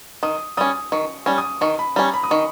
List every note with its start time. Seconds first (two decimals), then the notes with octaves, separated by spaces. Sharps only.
0.23 D#3 D#6
0.57 G3 C#4 D#6
0.92 D#3 C#6
1.26 G3 C#4
1.38 D#6
1.61 D#3 C#6
1.79 B5
1.96 G3 C#4 A#5
2.14 B5
2.23 D#6
2.31 D#3 C#6